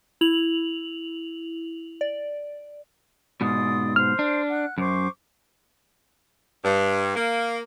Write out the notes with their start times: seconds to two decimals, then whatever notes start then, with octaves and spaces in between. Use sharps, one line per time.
0.21 E4 F7 F#7
2.01 D5
3.41 G#2 B2 D5 C6 D#6
3.96 C5 F6
4.19 D4
4.50 F#5 F#6
4.78 F#2 C5 C#6 D6
6.65 G2
7.15 A#3